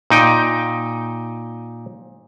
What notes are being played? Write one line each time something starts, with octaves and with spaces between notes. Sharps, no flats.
A#2 D#4 G5